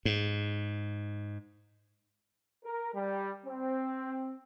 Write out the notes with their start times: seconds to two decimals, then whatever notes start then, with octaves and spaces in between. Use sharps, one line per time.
0.05 G#2
2.64 A#4
2.95 G3
3.46 C4